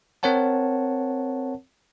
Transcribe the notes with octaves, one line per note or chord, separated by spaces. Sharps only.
C4 A#4 C#5 F#5 A5